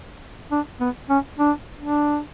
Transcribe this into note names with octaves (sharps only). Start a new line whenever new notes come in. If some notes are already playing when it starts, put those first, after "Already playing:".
D4
B3
C#4
D4
D4